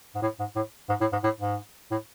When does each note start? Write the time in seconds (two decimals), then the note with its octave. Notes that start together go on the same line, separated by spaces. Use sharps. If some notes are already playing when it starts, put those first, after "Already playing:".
0.15 G#2
0.22 A2
0.40 G#2
0.56 A2
0.89 G#2
1.01 A2
1.13 G#2
1.24 A2
1.40 G#2
1.91 A2